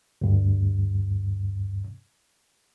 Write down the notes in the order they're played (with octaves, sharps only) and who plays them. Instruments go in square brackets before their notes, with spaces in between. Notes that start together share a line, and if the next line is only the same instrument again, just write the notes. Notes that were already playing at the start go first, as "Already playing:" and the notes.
[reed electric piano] D2 G2